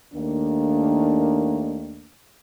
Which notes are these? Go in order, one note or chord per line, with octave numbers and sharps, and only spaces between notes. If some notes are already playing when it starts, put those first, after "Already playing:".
D#2 D#3 A3 A#3 D4